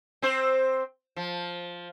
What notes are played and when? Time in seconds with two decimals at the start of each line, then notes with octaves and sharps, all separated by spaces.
0.22 C4 C5
1.16 F3